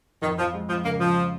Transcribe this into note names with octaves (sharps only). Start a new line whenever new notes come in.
F2 D#3
F2 F3
G#3
F2 F3
C#3 A#3
F2 F3